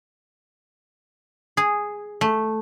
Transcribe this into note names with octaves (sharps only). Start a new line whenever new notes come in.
G#4
A3